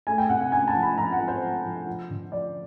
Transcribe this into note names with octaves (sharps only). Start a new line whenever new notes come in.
A3 G#5
G5
C3 F#5
F#5
C#4 G#5
A5
F3
B5
F3 A#5
F#5
F3
C5
F3
F3
F3
D3
F3 D5